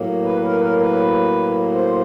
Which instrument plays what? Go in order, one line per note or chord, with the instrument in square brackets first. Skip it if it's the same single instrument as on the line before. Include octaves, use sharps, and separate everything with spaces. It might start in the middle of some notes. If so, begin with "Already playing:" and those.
Already playing: [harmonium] A2 F#3 A#3
B4
A#4
B4
A#4
B4
C5